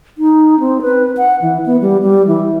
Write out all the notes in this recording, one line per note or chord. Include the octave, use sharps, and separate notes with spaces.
D#4
C4
B4
F#5
E3
B3
G3
G3
E3